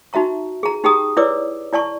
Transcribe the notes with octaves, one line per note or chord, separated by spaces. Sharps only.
D#4 F#4 E5 A#5 C#6
G#4 A#5
D#4 G4 G#4 G5 A#5 D#6
E4 B4 C#5 D5 D6 E6
E4 D5 A5 C#6